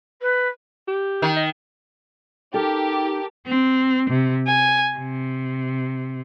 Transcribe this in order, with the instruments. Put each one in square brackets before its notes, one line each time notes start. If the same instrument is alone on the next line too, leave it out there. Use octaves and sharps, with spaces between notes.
[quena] B4
[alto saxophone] G4
[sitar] D#3
[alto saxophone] D#5
[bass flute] D#4 [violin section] G4 [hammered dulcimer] A4 A#4
[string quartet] C4
C3
G#5
C3